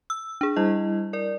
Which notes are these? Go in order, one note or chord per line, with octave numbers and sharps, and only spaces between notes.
E6
D4 G#4
G3 E4 D#5
A#4 D5